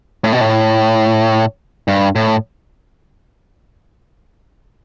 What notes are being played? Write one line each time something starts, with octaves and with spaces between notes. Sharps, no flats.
A2
B2
A2
G2
A2